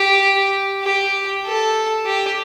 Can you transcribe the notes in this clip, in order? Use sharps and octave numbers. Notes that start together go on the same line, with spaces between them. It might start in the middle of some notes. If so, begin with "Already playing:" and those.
Already playing: G4
G4
A4
G4